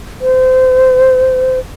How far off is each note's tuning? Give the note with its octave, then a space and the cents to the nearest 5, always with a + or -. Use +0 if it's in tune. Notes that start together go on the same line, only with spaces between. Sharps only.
C5 -25